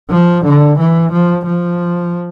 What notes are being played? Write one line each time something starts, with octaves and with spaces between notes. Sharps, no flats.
F3
D3
E3
F3
F3